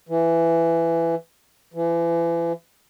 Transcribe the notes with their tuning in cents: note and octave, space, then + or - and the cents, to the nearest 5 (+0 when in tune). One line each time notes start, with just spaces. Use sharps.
E3 +15
E3 +35